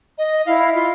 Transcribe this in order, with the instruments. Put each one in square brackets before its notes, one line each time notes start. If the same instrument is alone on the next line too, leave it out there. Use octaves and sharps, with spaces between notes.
[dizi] D#5
[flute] E4 [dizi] F5
[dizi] F4